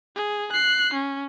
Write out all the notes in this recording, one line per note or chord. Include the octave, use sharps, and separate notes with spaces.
G#4
F#6 C7
C#4